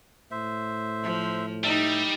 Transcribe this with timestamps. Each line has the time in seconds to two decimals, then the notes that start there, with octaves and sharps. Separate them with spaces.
0.31 A2 C5 E5
1.03 F3
1.63 G3 D#4 E5